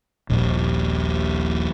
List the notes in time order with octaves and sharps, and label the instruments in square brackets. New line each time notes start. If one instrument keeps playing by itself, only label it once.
[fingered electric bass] D#1 A#1